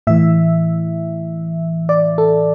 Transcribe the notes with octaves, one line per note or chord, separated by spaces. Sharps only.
A2 E3 E5
D5
A4